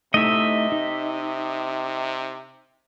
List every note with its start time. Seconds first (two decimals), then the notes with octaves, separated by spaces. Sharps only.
0.14 C3 A3 D#4 E4 D#5 E5
0.72 D#4